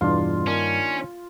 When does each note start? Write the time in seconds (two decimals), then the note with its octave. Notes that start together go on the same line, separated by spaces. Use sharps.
0.01 E2 G2 B2 D4 F4
0.47 D#3 A#3 C#4 D4